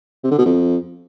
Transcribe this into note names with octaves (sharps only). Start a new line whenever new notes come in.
C3
D3
B2
F2